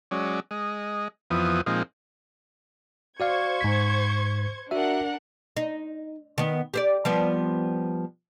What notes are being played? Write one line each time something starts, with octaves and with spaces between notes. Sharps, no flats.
F#3 G#3 C#4 D5
G#3 D#5
F2 E3 F3 B3 D#6
A#2 F3 G#3 C4 D#4
F#4 C5 D5 F5 C#6 G#6
G#2 B6
D4 F#4 A#4 E5 F#5
D#4
D#3 B3
G4 C5 D5
F3 G3 B3